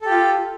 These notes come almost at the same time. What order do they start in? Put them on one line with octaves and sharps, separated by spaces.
A4 G4 F4